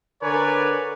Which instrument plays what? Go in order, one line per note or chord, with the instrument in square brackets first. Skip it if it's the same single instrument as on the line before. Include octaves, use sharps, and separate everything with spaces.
[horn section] D3 A#4 B4 C#5 D5 G#5